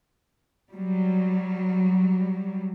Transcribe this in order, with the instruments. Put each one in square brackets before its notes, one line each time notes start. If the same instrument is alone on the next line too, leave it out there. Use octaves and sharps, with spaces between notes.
[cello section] F#3 G3